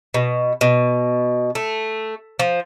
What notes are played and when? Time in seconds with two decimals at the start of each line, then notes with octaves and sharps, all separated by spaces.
0.14 B2
0.61 B2
1.55 A3
2.39 F3